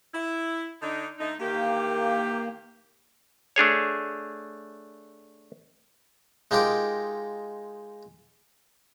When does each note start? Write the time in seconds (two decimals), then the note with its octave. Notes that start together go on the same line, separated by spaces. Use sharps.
0.14 E4
0.82 D3 D4 D#4
1.19 D3 A3 D#4
1.40 D#3 E3 A#3 G4
3.56 A3 D4 G#4 C#5
6.51 G#3 D#4 F4 G4 A#4